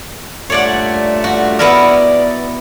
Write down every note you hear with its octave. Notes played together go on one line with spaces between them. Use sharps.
G2 A#2 A3 C#5 D5 F#5
F#4
B3 E4 A#4 D5